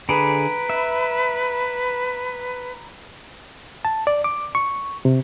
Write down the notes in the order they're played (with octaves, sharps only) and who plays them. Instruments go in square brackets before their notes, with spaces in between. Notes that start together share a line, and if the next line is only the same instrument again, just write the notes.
[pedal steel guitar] D3 G#4 [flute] B4 [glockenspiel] A#5 B5 D7
[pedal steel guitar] E5
[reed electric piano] A5
D5
D6
C#6
C3